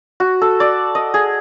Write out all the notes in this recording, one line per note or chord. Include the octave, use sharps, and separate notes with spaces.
F#4
A4
D5
D#5
G#4